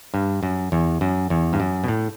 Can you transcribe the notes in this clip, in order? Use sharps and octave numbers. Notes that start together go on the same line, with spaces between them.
G2
F#2
E2
F#2
E2
G2
F#2
B2
A2